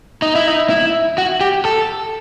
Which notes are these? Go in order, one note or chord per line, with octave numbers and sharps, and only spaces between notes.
D#4
E4
D#4
E4
F#4
G4
A4